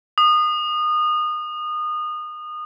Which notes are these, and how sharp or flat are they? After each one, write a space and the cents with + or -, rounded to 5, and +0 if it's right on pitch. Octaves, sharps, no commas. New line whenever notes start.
D#6 -25